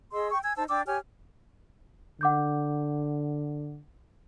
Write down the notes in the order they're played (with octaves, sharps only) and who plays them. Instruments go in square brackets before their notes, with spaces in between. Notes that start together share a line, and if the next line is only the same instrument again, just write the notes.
[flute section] G#4 D#5 C6 E6
G5 C#6
G#5 E6 G#6
D#4 C5 A5 E6
D4 G5 D6 E6
G4 C#5 G#5 F6
[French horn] D3 [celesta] F#5 D6 G6